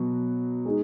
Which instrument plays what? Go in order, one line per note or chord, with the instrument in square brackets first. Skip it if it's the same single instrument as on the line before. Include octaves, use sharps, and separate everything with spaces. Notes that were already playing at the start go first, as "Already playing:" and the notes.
Already playing: [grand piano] B2 F#3
G#3 D#4 G#4